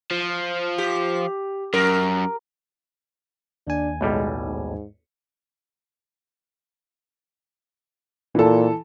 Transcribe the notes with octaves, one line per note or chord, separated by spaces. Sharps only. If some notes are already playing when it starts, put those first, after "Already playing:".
F3
G4
F#2 A#4
D#2 D4 G#5
B1 A2 G3 G#3
G#2
A#2 E3 A4